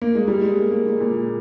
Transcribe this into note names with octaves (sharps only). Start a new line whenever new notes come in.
A#3
G#3
G3
G#3
A#3
A#3
G#3
A#2